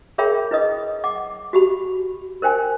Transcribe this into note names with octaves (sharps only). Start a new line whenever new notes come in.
G#4 A#4 C#5 E5 G5 B5
E4 B4 D#5 D#6
F#5 D6
F#4 G4 B5
A#4 C5 G5 G#5